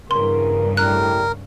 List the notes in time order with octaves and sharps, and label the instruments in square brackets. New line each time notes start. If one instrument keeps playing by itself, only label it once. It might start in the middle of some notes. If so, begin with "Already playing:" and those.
[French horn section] E2 A#4 [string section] G2 C#3 [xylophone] C6
[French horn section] A2 G3 [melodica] A#4 [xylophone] F#6